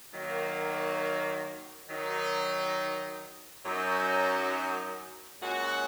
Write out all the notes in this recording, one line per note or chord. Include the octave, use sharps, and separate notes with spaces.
D#3 F#3 A#3
D#3 F#3 D#4
F#2 F#3 D#4
A#2 G#3 C#4 F#4